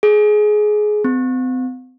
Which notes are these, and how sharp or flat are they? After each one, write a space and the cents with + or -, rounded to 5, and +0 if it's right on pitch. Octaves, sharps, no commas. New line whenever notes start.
G#4 +20
C4 -40